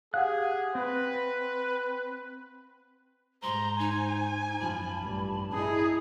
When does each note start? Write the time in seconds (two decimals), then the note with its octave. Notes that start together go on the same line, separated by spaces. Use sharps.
0.14 G4 G#4 F5 F#5 F#6
0.75 C4 B4
3.43 G#2 C5 A#5 C6
3.79 D#4 G#5
4.60 F#2 F3 A5 B5
4.99 A1 G2
5.54 D#4 E4 G#4